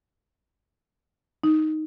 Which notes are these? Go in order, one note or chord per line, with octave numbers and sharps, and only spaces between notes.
D#4